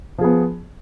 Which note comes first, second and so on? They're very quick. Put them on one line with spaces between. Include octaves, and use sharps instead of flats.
F3 G#4 B3